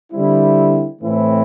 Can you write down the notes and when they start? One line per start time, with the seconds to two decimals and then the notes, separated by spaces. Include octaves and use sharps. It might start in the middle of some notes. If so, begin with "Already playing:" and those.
0.12 D3 G3 C4 E4
1.01 A2 E3 A3 C4 E4